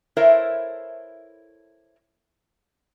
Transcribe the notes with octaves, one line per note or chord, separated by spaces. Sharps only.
E4 A4 A#4 C5 C#5 E5